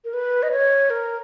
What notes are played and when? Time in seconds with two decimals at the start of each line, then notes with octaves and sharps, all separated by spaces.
0.05 A#4
0.14 B4
0.43 D#5
0.51 C#5
0.90 A#4